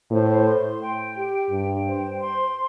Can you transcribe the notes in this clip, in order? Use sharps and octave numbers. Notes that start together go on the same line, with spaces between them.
A2 C5
C6
G5
G4
G2 G5
C5
C6